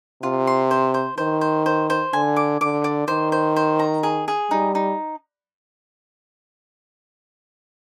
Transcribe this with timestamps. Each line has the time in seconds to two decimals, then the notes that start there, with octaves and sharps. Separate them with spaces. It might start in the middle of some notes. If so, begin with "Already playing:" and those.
0.23 C3 F4
0.47 C6
0.71 C5
0.94 C5
1.18 D#3 C5
1.41 C5
1.66 C5
1.90 C5
2.13 D3 G#5
2.36 D6
2.61 D3 D6
2.84 D5
3.08 D#3 C5
3.32 C5
3.56 C5
3.79 A#5
4.03 G#4
4.28 G#4
4.51 G3 D#4
4.75 D#4